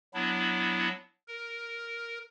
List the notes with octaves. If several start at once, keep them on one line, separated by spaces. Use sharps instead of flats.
F#3 B3 D4 E4
A#4